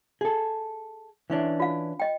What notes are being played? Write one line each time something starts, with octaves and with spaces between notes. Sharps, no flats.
G#4 A4
E3 C#4 D4
F4 F5
D#5 G5